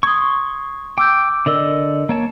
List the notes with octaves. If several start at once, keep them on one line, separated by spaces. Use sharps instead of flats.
C6 C#6 D#6 G#6
G5 D6 E6 G6
D3 A#4 D5 D#5 E6
A#3 C#5 A5